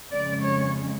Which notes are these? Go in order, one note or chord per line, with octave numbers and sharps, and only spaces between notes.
F2 C#3 G#3 D5
C#5